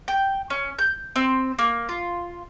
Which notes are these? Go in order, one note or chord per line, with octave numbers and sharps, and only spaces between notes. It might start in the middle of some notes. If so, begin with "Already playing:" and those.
G5
C#4
G6
C4
A#3
F4